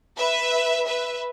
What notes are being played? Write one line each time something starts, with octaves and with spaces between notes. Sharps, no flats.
B4 E5
B4 E5